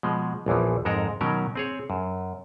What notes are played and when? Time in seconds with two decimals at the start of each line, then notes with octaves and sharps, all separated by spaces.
0.03 B2 F3 G#3
0.46 A#1 E2 E3 F3
0.85 F2 G#2 G#3 A4 A#4 A#5
1.21 B2 D#3 F#3 C#4 A#4
1.56 C4 G#4 C#5
1.90 F#2